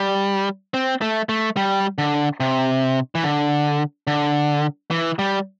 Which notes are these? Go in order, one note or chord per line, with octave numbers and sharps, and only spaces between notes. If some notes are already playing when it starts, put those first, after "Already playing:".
Already playing: G3
C4
A3
A3
G3
D3
C3
E3
D3
D3
E3
G3